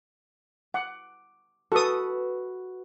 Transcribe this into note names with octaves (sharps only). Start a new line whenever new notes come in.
F#5 D6
F#4 A4 B4 D#6